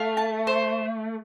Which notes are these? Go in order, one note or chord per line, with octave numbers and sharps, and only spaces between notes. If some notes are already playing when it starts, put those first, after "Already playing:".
Already playing: A3 F5
A5
C5